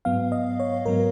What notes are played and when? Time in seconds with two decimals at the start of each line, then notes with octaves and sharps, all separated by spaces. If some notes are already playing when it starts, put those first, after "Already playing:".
0.05 G#2 F#3 B3 F5
0.32 D#5
0.60 C#5
0.86 G#2 F#3 B3 A#4